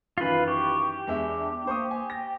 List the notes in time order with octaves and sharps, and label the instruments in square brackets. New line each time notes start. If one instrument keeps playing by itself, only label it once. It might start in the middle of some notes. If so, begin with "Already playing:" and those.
[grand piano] F#2 D#3 E3 [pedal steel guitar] F4 B4
[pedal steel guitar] G4 [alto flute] C#6
[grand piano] E2 G#3 E5 [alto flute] D4
[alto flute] A#3 [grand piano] C5 C#6 D#6
[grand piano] G#5
[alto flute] G5 [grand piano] A#6